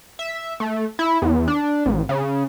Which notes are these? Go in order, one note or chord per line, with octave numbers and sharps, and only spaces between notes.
E5
A3
E4
E2
D4
A1
C#3